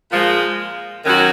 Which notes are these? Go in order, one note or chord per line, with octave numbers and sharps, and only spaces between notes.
A#2 F3 G#3
F#2 D#3 F#3 C#4 F#4